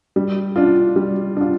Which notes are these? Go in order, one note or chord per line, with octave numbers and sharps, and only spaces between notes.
G3
D4 F4
G3
D4 F4